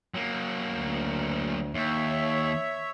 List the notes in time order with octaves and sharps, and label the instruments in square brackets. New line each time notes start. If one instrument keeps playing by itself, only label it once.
[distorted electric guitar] F#3 A#3
[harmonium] D2
[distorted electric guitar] D#2 [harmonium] C#5 E5